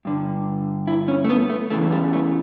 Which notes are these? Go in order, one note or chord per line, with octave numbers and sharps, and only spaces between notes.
G2 D3
E4
C#4
A3
B3
A3
E2 C#3 E3 A3
G3
A3